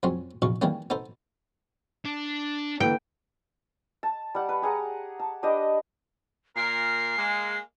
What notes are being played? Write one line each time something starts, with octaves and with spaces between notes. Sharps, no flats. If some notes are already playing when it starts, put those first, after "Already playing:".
F2 F#3 G#3 C4 C#4
A#1 E2 B2 F5 C#6
D#3 E3 G3 G#3 A#3 C#4
B3 D#4 A4 C5
D4
D3 E3 A#3 G5
A5
G3 F#5
B4
G4 G#4 F#5 A#5
A5
D4 G4 B4 D#5
A#2 A#4 C7
G#3 A#3